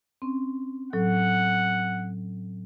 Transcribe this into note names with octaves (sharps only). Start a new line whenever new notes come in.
C4 C#4
A2 F#3 A4 F#5